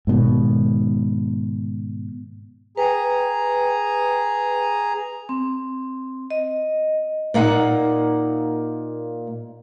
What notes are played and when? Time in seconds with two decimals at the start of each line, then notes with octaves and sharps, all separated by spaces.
0.07 G#2 B2 D#3
2.77 G#4 B4 G5 A#5
5.29 C4
6.30 D#5
7.34 A#2 A#3 D#4 F#5